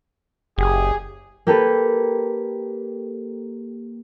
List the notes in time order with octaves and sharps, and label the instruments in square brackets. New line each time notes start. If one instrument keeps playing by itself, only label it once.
[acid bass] F#1 [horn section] G4 G#4
[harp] A#3 G4 A4 B4